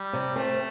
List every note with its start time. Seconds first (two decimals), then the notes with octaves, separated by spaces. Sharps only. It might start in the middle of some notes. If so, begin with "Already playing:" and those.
Already playing: G3
0.13 C3
0.36 A3 C4